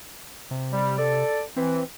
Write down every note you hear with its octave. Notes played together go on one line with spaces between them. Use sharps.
C3
G3
A4 D5
E3 C4